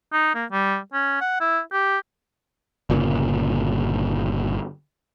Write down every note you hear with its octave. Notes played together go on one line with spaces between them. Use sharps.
D#4
A#3
G3
C#4
F#5
E4
G4
G1 A#2 C#3